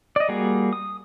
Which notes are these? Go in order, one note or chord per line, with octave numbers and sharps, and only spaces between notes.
D5 D#5
G3 A#3 F#4 G#4
D#6